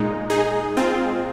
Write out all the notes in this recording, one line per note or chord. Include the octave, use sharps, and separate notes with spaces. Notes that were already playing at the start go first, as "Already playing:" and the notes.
Already playing: A#2 G#3 D#4
D#4 G#4
C4 F4